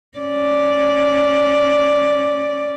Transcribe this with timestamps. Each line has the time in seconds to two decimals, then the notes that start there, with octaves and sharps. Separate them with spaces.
0.18 C#4 D5